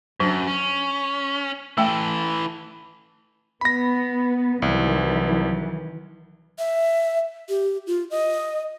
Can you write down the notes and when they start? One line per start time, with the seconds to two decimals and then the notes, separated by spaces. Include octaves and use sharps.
0.20 F#2 F#3 D4
0.47 C#4
1.78 E3 A3 A4 G5
3.61 B3 B5 A#6
4.62 C2 D#3 E3 F#3
6.58 E5
7.49 G4
7.87 F4
8.11 D#5